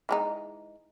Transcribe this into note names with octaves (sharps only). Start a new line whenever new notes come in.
E3 G#3 D#4